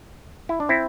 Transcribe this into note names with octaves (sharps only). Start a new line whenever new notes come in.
E4
D4
C4 E4